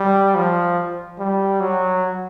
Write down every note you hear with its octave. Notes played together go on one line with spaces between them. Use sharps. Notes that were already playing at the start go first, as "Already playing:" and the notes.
Already playing: G3
F3
G3
F#3